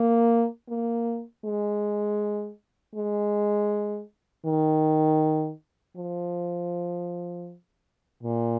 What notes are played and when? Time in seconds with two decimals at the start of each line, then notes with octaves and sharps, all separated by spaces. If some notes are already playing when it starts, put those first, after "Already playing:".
Already playing: A#3
0.69 A#3
1.45 G#3
2.95 G#3
4.45 D#3
5.97 F3
8.23 A#2